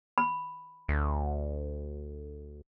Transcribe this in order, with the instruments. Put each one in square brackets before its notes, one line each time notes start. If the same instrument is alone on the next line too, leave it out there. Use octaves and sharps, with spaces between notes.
[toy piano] B5
[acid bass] D2